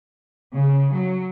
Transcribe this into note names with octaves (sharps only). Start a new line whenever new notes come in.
C#3
F#3